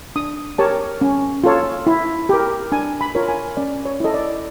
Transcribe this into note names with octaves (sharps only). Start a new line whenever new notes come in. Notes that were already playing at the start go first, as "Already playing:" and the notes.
D4 D#6
G4 A#4 C#5 A5
C#4
F4 A4 C#5
E4
G4 A#4
D4 G#5
B5
F4 A#4 C#5
G#5
C#4 D5
C#5
E4 A4 D#5
D5